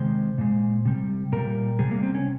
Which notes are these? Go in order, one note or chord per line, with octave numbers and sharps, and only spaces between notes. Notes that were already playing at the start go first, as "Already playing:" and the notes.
Already playing: C3 D#3 G#3 C5
A#2 G#3
C3 G3
A#2 G3 A#4
C3 G3 G#4
A#3
C4
C#4